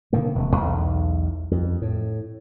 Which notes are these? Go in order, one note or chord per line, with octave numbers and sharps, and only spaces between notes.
B2 D3 D#3 A#3
E1 C3
B1 E2
F2
A2